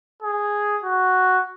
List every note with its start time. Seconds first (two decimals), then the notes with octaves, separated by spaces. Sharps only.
0.23 G#4
0.84 F#4